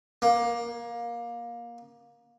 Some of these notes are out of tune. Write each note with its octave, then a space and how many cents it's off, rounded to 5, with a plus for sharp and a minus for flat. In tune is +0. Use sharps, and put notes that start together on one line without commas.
A#3 +20